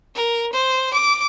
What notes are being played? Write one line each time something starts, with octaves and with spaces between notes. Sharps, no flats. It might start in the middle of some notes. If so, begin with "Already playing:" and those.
A#4
C5
D6